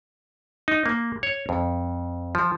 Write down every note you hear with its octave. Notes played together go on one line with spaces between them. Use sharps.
D#4
A#3
C#5
F2
F3